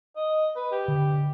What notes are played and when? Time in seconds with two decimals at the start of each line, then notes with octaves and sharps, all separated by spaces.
0.16 D#5
0.56 B4
0.72 G4
0.88 D3